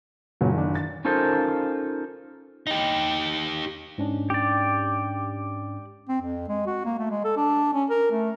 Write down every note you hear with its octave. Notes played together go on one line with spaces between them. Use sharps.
F#1 A#2 C#3 F#3
D#3 D4
A6
C#4 D#4 F4 A4 A#4 C5
D#4 G4
G#2 C#4 D4
G4 D5
C4
F2
G#3
F#4
A#3
A3
G#3
A4
D4
C#4
A#4
A3